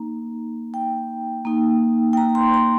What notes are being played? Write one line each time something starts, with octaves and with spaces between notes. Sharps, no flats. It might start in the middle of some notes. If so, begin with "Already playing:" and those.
Already playing: A#3 D#4 A#5
G5
A#3 D#4
G5
A#5
C6
A#5